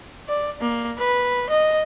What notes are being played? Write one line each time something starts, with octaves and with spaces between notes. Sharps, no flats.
D5
A#3
B4
D#5